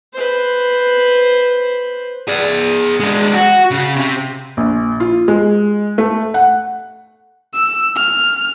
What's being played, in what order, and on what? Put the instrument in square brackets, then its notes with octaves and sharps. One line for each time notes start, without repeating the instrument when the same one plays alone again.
[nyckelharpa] B4 C5
[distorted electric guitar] G#4 D5
G#3 D4
F#4
C#3
C3
[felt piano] A#1
F4
G#3
A3
F#5
[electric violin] E6
F6